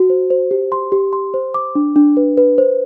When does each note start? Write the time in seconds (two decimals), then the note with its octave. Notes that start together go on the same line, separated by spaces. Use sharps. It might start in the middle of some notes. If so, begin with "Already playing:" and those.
Already playing: F#4
0.10 C5
0.30 C5
0.51 G4
0.72 C6
0.92 G4
1.13 C6
1.34 C5
1.54 D6
1.75 D4
1.96 D4
2.17 B4
2.37 B4
2.58 C5